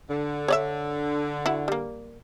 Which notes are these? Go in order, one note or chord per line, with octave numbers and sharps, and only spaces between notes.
D3
C#5 D5 E5
E4 F#4
G3 A#3